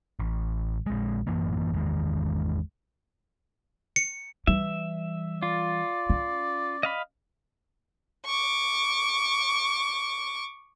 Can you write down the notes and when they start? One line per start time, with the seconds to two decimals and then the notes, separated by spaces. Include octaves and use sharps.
0.20 A1
0.86 A#1 G#3
1.27 A1 F#2 E3 A#3
1.73 G#1 E2 D#3 G#3
3.96 C#7
4.47 E3 G3 E5
5.43 F4 D5
6.10 C#4
6.83 D#5 F5 B5
8.26 C#6 D6